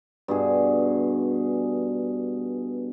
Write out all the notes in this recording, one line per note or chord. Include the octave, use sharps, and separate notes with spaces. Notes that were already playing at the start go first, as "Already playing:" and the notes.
G2 B2 G#4